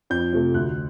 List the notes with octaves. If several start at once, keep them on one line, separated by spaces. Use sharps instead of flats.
F2 G6
C3 F3 A3
D2 F#6